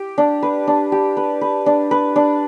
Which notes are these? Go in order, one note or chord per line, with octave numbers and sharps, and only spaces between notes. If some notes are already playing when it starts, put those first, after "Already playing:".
Already playing: G4
D4
B4
D4
G4
B4
B4
D4
B4
D4